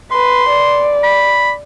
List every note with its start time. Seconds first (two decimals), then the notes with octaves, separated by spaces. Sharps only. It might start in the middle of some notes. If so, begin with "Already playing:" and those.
0.12 B4 C6
0.49 D5
1.03 B5